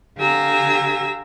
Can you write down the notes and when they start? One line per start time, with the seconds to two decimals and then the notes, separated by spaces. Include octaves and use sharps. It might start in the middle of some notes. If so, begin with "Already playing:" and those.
0.17 D3 G4 F5 G#5 A#5 E6